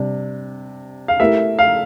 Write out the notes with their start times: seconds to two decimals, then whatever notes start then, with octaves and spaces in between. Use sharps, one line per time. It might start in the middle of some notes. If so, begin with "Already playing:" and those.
Already playing: C3 G3 D4
1.08 F5
1.20 A3 E4 G4 A#4 E5
1.59 F5